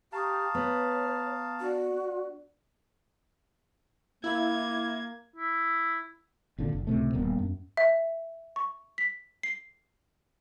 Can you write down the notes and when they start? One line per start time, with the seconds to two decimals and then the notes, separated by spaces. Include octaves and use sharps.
0.12 G4 F5 A5 A#5 C#6 D#6
0.55 B3 C#5
1.60 D4 F#4 D5
4.24 A#3 E4 G#6
5.36 E4
6.58 G#1 A#2 D3
6.73 F#1
6.87 C#2 A2 C3 A3
7.14 D#1 G2 A#3 B3
7.39 F#2
7.77 E5
8.56 C#6
8.98 B6
9.43 C7